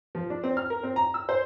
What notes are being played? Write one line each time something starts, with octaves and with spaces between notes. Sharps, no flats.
F3
D4
C4
F6
A#4
C4
A#5
E6
C5